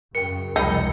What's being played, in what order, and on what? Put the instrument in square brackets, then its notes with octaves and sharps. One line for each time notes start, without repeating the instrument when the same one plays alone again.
[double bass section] F#2 C#3 [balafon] A#4 G5 [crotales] C#7
[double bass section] F1 C#2 [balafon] G3 G5 B5 [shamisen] D#4